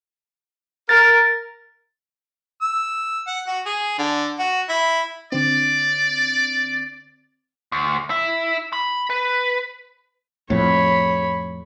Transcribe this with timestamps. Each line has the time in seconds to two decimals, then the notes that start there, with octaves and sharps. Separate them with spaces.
0.89 A#4 A6
2.62 E6
3.27 F#5
3.47 F#4
3.66 G#4
3.98 D3
4.39 F#4
4.69 E4
5.32 D3 C4 D5
7.72 D2
8.10 E4
8.73 B5
9.10 B4
10.50 F2 A2 C#5 B5